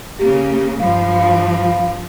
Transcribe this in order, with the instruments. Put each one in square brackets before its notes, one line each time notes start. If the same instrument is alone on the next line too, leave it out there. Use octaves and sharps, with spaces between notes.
[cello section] C#3 A#3 [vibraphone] G4
[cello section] G2 F3 [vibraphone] F5 B5